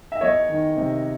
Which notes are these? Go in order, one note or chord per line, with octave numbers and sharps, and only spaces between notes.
E5
E2 C#5 D#5
D#3
C3